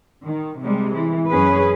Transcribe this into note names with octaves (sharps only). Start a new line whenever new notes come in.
D#3
C3 G3 G#3
E3
F#2 C#4 G#4 B4